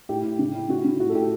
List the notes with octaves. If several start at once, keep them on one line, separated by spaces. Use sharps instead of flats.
A2 G4
A2
C#3
E4
C#3 F#4
C#3
A2 F#4
A4
A2 G4